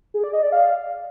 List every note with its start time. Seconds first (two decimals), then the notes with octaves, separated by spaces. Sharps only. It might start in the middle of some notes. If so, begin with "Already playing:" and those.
0.14 G#4
0.24 D5
0.33 D#5
0.43 D5
0.52 F5